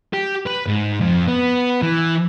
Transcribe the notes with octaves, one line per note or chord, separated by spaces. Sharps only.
G4
B4
G#2
F2
B3
E3